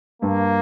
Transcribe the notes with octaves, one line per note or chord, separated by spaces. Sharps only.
G2 A#3